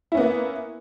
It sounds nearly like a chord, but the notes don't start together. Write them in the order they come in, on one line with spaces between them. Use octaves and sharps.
E4 C#4 B3 A#3